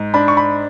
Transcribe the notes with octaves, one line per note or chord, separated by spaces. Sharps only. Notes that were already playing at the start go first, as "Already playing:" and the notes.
Already playing: G#2
D4 B5
C#6
B5